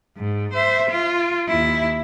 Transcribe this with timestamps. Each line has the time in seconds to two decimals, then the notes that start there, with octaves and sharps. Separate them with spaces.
0.17 G#2
0.53 C5 E5
0.90 F4
1.48 D#2 E4